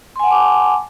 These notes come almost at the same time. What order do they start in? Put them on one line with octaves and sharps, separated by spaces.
C6 G#5 F#5 A5 D6